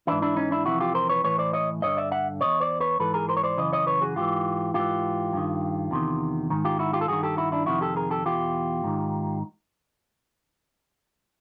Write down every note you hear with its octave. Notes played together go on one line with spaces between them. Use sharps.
G#2 E3 D4 E4
D4 E4
C#4 D#4
D4 E4
F2 C3 E3 E4 F#4
F4 G4
A#4 C5
B4 C#5
A2 E3 B4 C#5
C5 D5
C#5 D#5
G2 D3 C#5 D#5
D5 E5
E5 F#5
E2 B2 C#5 D#5
C5 D5
B4 C#5
G#2 E3 A4 B4
G#4 A#4
A#4 C5
C#5
C5 D5
F#2 C#3 E3 D#5
C#5 D#5
B4 C#5
F#4 G#4
G#2 E3 F4 G4
G#2 E3 F4 G4
G2 D#3
E2 C3 D#3
G#2 D#3
F4 G4
E4 F#4
F4 G4
A4
G2 D#3 F#4 G#4
G4 A4
E4 F#4
D4 E4
F2 C3 D#3 E4 F#4
G4 A4
G#4 A#4
G4 A4
E2 B2 F4 G4
G#2 D#3